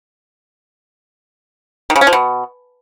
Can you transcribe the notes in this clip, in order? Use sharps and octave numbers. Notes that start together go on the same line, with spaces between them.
D#3
C#3
C#4
F3
B2